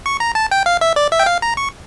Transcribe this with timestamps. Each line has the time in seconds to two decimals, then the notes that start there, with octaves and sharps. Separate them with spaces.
0.06 C#6
0.20 A#5
0.35 A5
0.51 G5
0.66 F5
0.81 E5
0.96 D5
1.12 E5
1.19 G5
1.26 F5
1.42 A#5
1.57 C#6